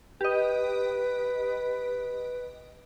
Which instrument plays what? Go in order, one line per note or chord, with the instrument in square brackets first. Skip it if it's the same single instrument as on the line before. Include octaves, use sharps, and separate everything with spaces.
[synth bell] G4 D#5 [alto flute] B4